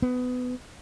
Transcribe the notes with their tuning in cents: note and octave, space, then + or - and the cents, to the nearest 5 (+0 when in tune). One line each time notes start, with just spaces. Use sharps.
B3 +20